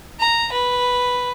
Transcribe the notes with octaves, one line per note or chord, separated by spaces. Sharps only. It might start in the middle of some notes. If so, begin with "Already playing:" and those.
A#5
B4